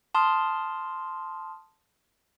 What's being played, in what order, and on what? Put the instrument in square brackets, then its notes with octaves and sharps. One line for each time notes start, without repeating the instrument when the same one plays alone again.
[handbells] A5 C6 D#6 F6